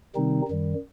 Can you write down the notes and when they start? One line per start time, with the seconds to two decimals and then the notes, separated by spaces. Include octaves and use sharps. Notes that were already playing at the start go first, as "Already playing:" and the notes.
0.15 C3 D#3 G3 C4 D#4
0.48 F#2 D#3 G3